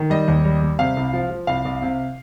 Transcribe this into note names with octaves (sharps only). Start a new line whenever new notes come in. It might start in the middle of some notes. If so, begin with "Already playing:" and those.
Already playing: D#3
G3 D#5
D#2
G3
G3
C3 F5
C2
F3
F3
C2 F5
C2
C3